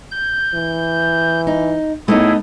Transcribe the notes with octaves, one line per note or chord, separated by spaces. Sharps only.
G6
E3
D#4
A2 A3 B3 D#4 E4 G#4